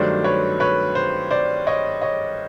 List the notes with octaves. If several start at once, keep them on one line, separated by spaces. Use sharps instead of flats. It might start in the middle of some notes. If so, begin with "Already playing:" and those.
Already playing: G2 D#3 F#3 A3 D4 C5 D5
B4 C#5
B4 C#5
C5
C5 D5
C#5 D#5
C#5 D#5